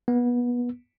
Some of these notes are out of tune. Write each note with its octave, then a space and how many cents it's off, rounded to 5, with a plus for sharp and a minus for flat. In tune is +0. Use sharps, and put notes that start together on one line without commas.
B3 -25